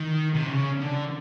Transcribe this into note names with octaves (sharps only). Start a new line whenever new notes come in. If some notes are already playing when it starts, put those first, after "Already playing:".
Already playing: D#3
C3
C#3
D3